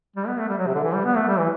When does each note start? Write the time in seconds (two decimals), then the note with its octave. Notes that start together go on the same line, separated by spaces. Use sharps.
0.17 G3
0.27 B3
0.39 A3
0.49 G3
0.58 F#3
0.67 C3
0.75 D3
0.84 E3
0.95 G3
1.05 B3
1.16 A3
1.28 G3
1.39 E3